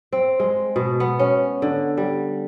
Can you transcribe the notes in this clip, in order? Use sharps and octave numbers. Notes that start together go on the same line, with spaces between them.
C4
G#3
B2
B3
C#4
D3
G3